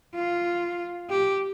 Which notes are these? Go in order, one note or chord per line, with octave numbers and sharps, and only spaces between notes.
F4
G4